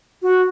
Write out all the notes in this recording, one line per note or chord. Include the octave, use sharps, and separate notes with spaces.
F#4